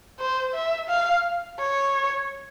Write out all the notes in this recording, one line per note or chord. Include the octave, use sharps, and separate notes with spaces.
C5
E5
F5
C#5